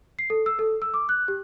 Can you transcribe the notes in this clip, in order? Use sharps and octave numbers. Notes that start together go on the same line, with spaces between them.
C7
A4
E6
A4
E6
D6
F#6
G4